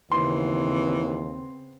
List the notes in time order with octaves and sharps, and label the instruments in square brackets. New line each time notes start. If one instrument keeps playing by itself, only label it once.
[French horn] D#2 [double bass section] C#3 B3 C4 [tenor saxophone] E3 [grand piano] C6